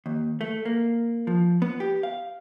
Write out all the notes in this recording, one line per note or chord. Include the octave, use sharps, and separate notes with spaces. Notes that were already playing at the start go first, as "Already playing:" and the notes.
D#2
A3
A#3
F3
B3
G4
F5